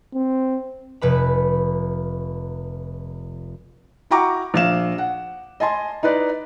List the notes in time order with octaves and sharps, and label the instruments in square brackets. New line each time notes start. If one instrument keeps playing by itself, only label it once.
[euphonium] C4
[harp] F1 B4 B5
[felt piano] E4 F#4 G5 A#5 C#6 D6
A#1 F5 E7
F#5
D#5 G#5 A5 C6
D#4 E4 B4 D5